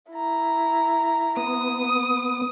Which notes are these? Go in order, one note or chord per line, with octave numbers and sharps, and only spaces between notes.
E4 A#5
B3 D#6